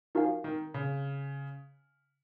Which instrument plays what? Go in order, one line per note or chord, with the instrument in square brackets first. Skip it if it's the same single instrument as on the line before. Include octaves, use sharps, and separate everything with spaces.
[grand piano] F3 [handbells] D#4 F#4 A#4 F5 G#5
[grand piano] D#3
C#3